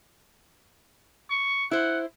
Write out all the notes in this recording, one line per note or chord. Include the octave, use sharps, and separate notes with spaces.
C#6
E4 C5 F#5